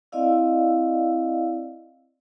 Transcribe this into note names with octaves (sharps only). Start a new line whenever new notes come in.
C4 E4 D5 D#5 F5 E6